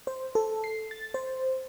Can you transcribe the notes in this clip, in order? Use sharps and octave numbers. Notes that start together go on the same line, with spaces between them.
C5
A4
C7
A6
C5